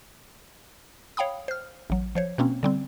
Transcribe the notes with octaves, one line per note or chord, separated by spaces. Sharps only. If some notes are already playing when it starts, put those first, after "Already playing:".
C#5 F5 G5 B5 D#6
C5 F6
A1 F#3
F3 C5 C#5
B2 A#3 C4 C#4
D3 G3 C4